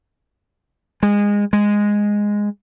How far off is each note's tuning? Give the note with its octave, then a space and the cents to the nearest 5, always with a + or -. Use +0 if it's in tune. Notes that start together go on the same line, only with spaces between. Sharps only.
G#3 -20
G#3 -5